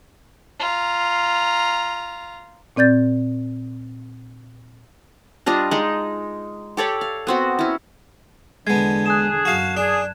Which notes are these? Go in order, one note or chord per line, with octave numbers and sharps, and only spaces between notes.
F4 A#5
A#2 C4 D5 G6 A6
G3 D4 F4 D#5
G#3 D#4
G4 A4 C#5 D5
F5
B3 C4 F#4
C#4 E4
E2 D3 G#3 B3 A5 G#6
G#4 F#6 E7
F#2 F#4 F5
D4 G#4